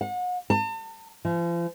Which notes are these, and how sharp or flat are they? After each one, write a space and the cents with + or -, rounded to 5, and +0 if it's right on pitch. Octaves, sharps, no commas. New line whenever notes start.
F#5 -35
A5 +40
F3 -40